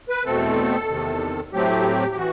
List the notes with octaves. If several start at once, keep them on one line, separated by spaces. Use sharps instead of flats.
B4
E2 B2 A3 C4 A4
E2 C3 D#3
A2 F#3 A3 C4 G4
G4
E3 F#4